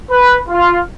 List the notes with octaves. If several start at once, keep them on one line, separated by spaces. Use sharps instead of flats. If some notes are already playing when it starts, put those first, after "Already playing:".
B4
F4